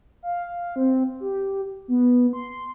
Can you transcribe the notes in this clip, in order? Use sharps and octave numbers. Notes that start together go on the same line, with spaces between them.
F5
C4
G4
B3
C6